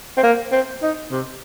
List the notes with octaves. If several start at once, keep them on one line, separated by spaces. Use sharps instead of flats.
C4
A#3
C4
D#4
C3